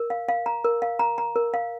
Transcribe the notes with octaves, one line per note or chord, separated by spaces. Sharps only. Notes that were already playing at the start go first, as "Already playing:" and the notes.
Already playing: A#4
F5
F5
A#5
A#4
F5
A#5
A#5
A#4
F5